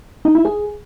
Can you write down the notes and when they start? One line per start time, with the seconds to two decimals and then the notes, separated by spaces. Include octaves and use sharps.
0.25 D#4
0.35 E4
0.45 G#4